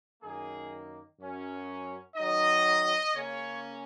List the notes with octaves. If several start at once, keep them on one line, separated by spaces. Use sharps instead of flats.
F#2 D#3 A#3 G#4
F#2 F#3 C#4
D#3 F#3 D#4 D#5
C#3 A#3 C#4 C#5